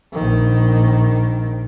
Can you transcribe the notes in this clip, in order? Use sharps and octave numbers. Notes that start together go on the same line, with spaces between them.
A#1 D#3